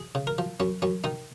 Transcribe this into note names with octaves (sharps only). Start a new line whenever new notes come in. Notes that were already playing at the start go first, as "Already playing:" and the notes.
Already playing: G#4
C#3
A#4
F3
F#2 C#4
F#2 C#4
D#3 D#4